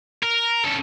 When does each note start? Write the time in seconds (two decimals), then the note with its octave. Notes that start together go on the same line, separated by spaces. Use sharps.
0.23 A#4
0.65 C#3 A4